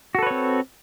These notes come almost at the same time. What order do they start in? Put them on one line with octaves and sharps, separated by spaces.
F#4 A4 B4 C#5 C4